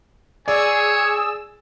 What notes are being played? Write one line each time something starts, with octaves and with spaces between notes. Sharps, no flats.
G#4 C#5 D5 G#5 E6